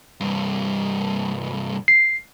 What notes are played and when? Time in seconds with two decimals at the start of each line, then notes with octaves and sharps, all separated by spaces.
0.20 C2 G2
1.88 C7